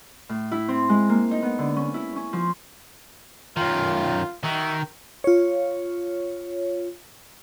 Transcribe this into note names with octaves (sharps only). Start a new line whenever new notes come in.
A2
E4
C4
G#3
A#3
D#4
B3
D3
C#4
E4
C#4
F3
F#2 D#3 F4
D#3 F#4 D#5 E5
F4 C#5